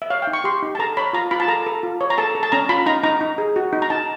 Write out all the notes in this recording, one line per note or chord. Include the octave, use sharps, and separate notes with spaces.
E5
C#5 F5
G5
D#4
C#6
G4 C6
D#4
A5
A4 A#5
C#5 B5
F4 A#5
F4 B5
A5
A4 A#5
A4
F4
C#5
A#5
A4 A5
A4
A5
C#4 A#5
F4 B5
D#4 A#5
D#4 A#5
D#4
G#4
F#4
D#4
A#5
D#4 A5